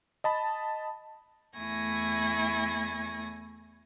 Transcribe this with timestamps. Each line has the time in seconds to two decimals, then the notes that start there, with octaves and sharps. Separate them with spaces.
0.24 D#5 A5 B5
1.58 E2 A3 E4 G#5 C#6 A#6